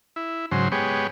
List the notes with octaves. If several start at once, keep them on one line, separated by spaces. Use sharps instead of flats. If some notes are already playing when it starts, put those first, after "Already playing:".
E4
G#2 C#3 F#3 C5
G#3 B3 G4 C#5